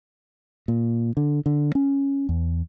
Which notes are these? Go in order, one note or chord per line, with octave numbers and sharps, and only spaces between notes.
A#2
D3
D3
C#4
E2